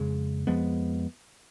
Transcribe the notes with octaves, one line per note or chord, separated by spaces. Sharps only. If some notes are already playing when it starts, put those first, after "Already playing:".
Already playing: F2 C#3 G#3
F2 F3 G#3 B3